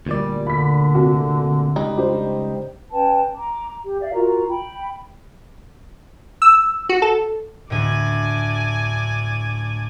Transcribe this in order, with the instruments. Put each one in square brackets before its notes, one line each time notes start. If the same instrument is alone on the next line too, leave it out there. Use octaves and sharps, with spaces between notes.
[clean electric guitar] D2 A#2 D5 [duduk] G3
[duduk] D3 [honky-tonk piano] B5 B6
[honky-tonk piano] C3 F#4
[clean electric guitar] C#2 G3 D#4
[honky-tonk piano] D4 G4 C5
[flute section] C#4 B4 G5 A5
A#5 D6
G4
D5 E5 F5
F4 F#4 A#4 A#5
G5 B5
[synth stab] E6
F#4
A4
[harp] D2 A2 [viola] D5 G#5